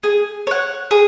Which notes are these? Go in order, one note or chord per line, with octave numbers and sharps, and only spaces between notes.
G#4
C#5 F#5
G#4